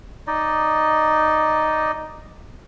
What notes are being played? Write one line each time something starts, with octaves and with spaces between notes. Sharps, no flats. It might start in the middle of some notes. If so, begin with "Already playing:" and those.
D#4 D5 D#5